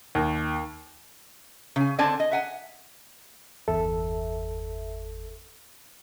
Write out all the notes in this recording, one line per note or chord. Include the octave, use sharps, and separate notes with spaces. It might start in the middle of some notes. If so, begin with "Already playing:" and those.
D#2
C#3 G#5
D3 C4 D5 G#5 A5
D#5
E5 F#5 G#5
G1 E2 A4 E5